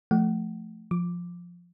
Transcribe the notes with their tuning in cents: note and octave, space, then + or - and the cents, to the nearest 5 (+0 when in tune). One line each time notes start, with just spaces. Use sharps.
F3 +0 A3 +0 F#5 +35
F3 +5 D6 +0